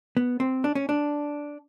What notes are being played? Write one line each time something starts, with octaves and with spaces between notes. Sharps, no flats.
B3
C4
D4
C#4
D4